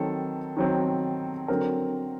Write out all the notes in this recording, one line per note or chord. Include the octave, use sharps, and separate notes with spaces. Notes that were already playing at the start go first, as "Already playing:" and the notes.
Already playing: D#3 F#3 C4 A4
D#3 F#3 C4
D3 F#3 C4 A#4